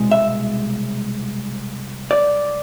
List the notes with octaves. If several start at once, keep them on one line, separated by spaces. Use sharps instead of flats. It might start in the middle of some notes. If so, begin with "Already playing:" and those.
Already playing: C2 B2 G#3
E5
D5